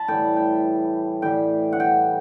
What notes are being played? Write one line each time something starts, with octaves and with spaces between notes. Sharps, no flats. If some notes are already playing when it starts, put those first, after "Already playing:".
Already playing: A5 B5
A2 E3 G3 G5
G5
A2 E3 G3 G5
F#5
G5